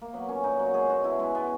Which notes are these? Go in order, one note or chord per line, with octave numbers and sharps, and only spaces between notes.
A#3
F#3 B3
A#2 C#4
A#2 D#4
F#3 F#4
G#3 G#4
B2 F#4
B2 E4
G#3 E4
B3